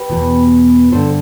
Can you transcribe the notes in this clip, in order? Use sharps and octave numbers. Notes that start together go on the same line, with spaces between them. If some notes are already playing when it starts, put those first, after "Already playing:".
Already playing: G4 B4
E2 B2
G2 D3 A4 C5